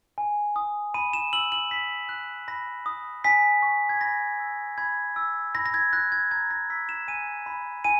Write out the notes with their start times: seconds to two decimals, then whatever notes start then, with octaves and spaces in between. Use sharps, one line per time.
0.18 G#5
0.56 D#6
0.94 B5 D#7
1.13 E7
1.33 E6 F#7
1.52 F#7
1.71 B5 B6
2.09 F#6
2.48 B5 A#6
2.86 D#6
3.24 G#5 B6
3.63 C#6
3.89 G#6
4.01 B5 A#6
4.40 E6
4.78 B5 G#6
5.16 E6
5.55 B5 A#6
5.66 A#6
5.74 G#6
5.93 F#6 A#6
6.12 G#6
6.31 A#5 G#6
6.51 A#6
6.70 E6 B6
6.89 E7
7.08 G#5 D#7
7.46 B5
7.84 G#5 D#7